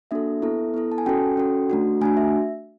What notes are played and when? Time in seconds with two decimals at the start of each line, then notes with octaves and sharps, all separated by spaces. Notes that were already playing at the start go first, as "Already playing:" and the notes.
0.11 A#3 D4 F#4 A4 E5
0.42 B3 E4 A4
0.74 B3 E4 A4
0.92 A5
0.98 G#5
1.06 C#4 F#4 A4 G5
1.37 C#4 F#4 A4
1.70 A3 D4 F#4
2.01 A3 D4 F#4 G#5
2.17 E5